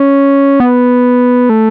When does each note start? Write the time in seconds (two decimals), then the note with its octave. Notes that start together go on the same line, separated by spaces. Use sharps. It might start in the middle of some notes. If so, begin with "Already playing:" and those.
Already playing: C#4
0.60 B3
1.49 A3